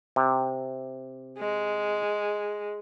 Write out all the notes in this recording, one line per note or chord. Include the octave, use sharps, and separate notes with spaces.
C3
G#3